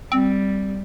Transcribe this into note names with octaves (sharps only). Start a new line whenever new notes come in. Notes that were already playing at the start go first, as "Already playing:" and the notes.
G3 C4